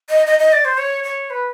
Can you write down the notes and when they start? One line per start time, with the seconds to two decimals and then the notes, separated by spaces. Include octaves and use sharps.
0.09 D#5
0.26 D#5
0.39 D#5
0.53 D5
0.65 C5
0.78 C#5
1.04 C#5
1.30 B4